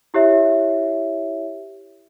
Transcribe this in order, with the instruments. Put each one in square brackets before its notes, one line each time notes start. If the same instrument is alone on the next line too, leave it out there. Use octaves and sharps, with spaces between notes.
[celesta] E4 G4 C#5 E5